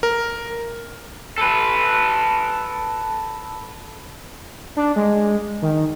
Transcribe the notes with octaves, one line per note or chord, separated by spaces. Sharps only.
A#4
A4 B4
D4
G#3
D#3